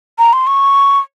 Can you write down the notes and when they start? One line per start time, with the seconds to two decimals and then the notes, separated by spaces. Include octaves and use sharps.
0.18 A#5
0.33 C6
0.47 C#6